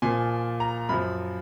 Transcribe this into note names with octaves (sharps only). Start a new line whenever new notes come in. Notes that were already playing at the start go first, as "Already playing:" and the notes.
A#2 F3 G#5
A#5
F#2 F3 B5